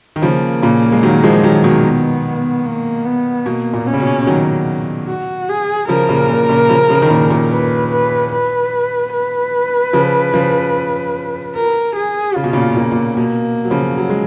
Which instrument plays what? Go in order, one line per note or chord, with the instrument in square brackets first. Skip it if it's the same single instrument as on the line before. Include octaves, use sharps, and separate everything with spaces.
[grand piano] D#3
[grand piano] C#3 F3 [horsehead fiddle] A#3
[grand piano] A#2 C#3
G#3
D#3 F#3
F3 G#3
D#3 F#3
B2 D#3
[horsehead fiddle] B3
A#3
B3
[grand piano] B2 [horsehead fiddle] A#3
[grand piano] A#2
[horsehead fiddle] C#4
[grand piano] C#3
B2
D#3 F#3
[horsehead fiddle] F#4
G#4
[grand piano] C#3 F3 [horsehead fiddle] A#4
[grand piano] A#2 C#3
A#2
A#2 C#3
C#3 F3
C#3 F3
D#3
A#2 C#3
A#2
[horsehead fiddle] B4
B4
B4
B4
[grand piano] C#3 F3
C#3 F3
[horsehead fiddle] A#4
G#4
[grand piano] C#3 [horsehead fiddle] F4
[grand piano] B2
A#2 C#3
[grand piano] A#2 [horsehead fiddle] A#3
[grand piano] A#2
[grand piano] B2 [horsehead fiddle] A#3
[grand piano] F#3
C#3 F3
F#3
G#3